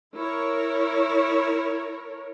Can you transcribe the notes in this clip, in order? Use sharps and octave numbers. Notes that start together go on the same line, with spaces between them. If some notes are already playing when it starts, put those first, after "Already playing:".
E4 A#4 C#5